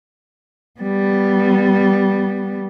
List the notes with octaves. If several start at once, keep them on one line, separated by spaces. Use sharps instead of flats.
G3 B3